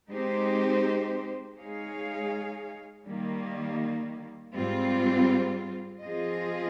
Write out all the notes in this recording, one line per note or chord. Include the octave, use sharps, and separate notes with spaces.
G#3 C4 D#4 G4 C5
G#3 D#4 G#4 C#5 F5
D#3 G3 A#3
G#2 G3 C4 F4
F3 C4 F4 G#4 D#5